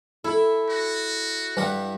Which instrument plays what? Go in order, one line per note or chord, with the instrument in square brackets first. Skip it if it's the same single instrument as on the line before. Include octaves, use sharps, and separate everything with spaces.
[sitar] E4 [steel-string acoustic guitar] A4
[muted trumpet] F#4
[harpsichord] G2 G3 F#5